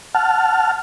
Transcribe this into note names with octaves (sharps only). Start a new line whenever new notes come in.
F#5 A5 F6